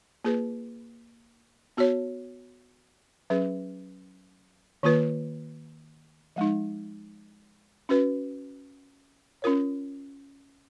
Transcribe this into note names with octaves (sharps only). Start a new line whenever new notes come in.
A#3 F4 G#4 B4
B3 F#4 C#5
F#3 C#4 G#4 B4
D#3 A#3 F4 B4
F3 G#3 D#4
C#4 F#4 B4
C#4 F4 A#4 C#5